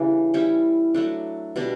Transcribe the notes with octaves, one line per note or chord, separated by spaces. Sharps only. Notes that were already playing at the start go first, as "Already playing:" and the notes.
Already playing: C#3 E3 G3 D4 E4
G3 C#4 E4 G4
F#3 A3 D4
B2 G3 D4